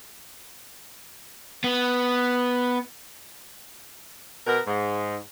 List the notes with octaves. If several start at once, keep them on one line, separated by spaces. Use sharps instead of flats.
B3
B2 B3 A#4
G#2